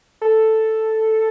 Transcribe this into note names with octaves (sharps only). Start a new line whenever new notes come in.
A4